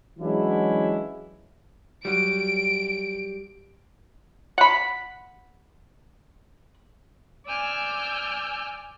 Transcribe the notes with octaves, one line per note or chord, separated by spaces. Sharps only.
E3 F#3 G#3 C#4 D4 E4
F#3 G3 D7
F#5 B5
D5 G#5 E6 F6 G6